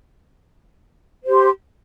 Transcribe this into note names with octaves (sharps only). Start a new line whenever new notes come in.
G4 C5 C6